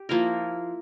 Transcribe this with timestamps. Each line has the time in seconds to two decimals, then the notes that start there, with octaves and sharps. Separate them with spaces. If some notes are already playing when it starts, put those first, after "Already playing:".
Already playing: G4
0.09 F3 A#3 E4 A#4